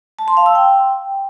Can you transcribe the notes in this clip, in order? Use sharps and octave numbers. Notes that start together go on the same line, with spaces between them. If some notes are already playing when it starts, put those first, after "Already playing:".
A5
C6
F5
E6
G5